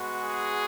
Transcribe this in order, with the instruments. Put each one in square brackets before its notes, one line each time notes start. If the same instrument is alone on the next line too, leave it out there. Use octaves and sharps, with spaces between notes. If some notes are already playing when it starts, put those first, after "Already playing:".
Already playing: [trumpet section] G#3 B3 F#4
G#4